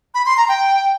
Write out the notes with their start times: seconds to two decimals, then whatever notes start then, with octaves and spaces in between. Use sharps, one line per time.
0.14 B5
0.26 C6
0.37 A#5
0.49 G5